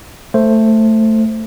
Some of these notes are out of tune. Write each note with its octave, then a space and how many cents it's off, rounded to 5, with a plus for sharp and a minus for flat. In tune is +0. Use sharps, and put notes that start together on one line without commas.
A3 +5 C5 +5